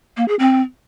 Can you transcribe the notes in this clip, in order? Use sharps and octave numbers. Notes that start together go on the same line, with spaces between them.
A#3
G#4
C4